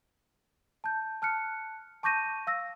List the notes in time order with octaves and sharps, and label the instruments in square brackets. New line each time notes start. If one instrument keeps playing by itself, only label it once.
[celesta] A5 G6
A5 F6 F#6 C#7
A5 C#6 D6 G6 A#6 D#7
F5 E6 A#6